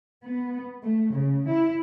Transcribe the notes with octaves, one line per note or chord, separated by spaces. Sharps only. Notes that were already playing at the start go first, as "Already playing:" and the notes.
B3
A3
C#3
E4